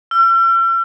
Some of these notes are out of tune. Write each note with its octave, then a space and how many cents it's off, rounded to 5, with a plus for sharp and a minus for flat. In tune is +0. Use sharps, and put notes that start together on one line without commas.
E6 +45